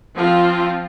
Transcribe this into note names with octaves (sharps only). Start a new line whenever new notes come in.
F3 C4 F4